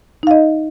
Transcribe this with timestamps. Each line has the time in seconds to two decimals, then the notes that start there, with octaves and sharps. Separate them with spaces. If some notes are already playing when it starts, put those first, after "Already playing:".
0.23 D#4
0.27 F5
0.31 D#5